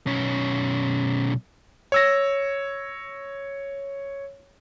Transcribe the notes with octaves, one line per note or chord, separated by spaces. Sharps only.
B1 C#4
C#5 E6 A#6